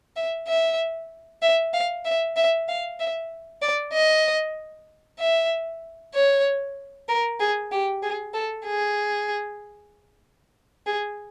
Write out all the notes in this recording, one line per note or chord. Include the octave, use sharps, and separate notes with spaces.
E5
E5
E5
F5
E5
E5
F5
E5
D5
D#5
E5
C#5
A#4
G#4
G4
G#4
A4
G#4
G#4